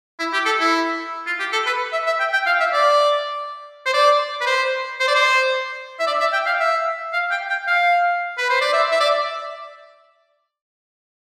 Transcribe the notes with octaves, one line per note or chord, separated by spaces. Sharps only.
E4
G4
A4
E4
F4
G4
A4
B4
E5
E5
G5
G5
F5
E5
D5
C5
D5
B4
C5
C5
D5
C5
E5
D5
E5
G5
F5
E5
F5
G5
G5
F5
B4
C5
D5
E5
E5
D5